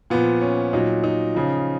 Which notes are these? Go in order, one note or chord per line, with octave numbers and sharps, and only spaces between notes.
A#2 F3 B3
C#4
A#2 F#3 D#4
D#4
C#3 F3